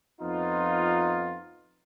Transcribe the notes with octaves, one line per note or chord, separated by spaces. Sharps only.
F2 B3 D#4 F4